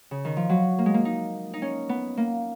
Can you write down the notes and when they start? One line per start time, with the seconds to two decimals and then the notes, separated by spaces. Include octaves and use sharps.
0.11 C#3
0.25 D#3
0.37 F3
0.49 F#3
0.79 A#3
0.86 G#3
0.94 A#3
1.05 D#4
1.54 D#4
1.62 C#4
1.89 B3
2.17 A#3